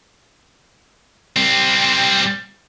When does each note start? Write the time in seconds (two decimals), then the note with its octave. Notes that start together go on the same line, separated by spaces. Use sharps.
1.36 G3 C4